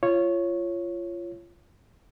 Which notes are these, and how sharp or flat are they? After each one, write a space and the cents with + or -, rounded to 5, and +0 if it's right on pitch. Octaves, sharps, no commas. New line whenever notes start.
F4 -25 C#5 -5